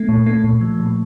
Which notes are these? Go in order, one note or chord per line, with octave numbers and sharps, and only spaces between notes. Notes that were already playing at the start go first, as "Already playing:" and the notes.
Already playing: A3
A#2
A3
A#2
F3
A#2